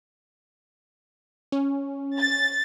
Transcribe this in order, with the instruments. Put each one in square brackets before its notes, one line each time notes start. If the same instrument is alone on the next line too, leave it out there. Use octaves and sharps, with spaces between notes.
[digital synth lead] C#4
[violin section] A6